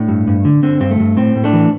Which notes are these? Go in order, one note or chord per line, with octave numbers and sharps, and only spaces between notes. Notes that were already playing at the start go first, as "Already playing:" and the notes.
Already playing: A2 A3 D4
G2
G2
D3
D3 C4
G2 C4
A3
G2
A2 C4
A2
A3 D4
E3